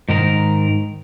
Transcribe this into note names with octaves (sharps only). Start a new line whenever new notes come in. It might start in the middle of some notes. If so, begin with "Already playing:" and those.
G#2 D#3 A#4